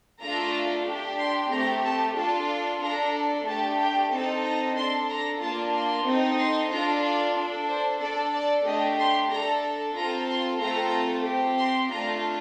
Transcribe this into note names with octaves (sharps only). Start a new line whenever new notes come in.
A3 D4 F4 A4 A#5
D4 G4
C6
A3 C4 G4 A#5
A5
D4 F4 A4 A5
D4 A4 A#5
A3 D4 G4 A5
G5
C4 D#4 A4 A5
A#5
D4 A4 C6
A#5
A#3 D4 F4 A5
C6
C4 D#4 A4
C6
D4 F4 A4 A#5
D5
D4 A4
C5
D4 A4 D5
D5
A3 D4 G4 D#5
C6
D4 A4 A#5
C4 F4 A4 A#5
C6
A3 C4 F4 A4 A#5
C4 G4
C6
A3 D4 F4 A#5